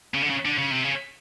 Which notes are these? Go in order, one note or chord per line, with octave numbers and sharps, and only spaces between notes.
C#3
D3
C#3
D3
C#3
C3
C#3